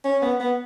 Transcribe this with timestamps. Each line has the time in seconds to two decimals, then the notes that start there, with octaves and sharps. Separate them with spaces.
0.05 C#4
0.22 B3
0.40 B3